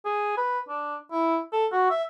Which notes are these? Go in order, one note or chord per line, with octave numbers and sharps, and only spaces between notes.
G#4
B4
D4
E4
A4
F#4
E5